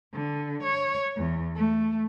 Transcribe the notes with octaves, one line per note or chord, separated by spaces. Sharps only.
D3
C#5
E2
A3